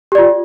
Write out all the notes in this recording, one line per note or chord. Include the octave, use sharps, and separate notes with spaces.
F4 G4 D5